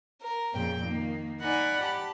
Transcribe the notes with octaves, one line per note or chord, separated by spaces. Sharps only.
A#4
F2 A#2 C#3 G5
D#3 A#3
D#4 D5 F#5 G#5 B5
G4 A5 B5